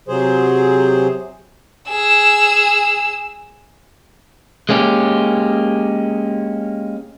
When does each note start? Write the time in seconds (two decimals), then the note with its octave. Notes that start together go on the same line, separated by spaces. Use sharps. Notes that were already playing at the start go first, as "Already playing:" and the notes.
0.08 C3 F#3 G#4 C5
1.90 G#4 E6
4.69 G#3 A#3 C#4 G4